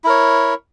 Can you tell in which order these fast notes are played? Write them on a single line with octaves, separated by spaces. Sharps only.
E4 A#4 C#5